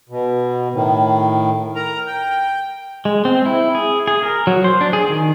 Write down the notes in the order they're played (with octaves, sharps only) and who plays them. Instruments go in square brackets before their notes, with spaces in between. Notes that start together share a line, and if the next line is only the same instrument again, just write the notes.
[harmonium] B2
A2 D#3
A#4 A#5
G5
[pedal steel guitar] G#3
C4
E4
G#4
G#4
A#4
F#3
C5
D4
G#4
D#3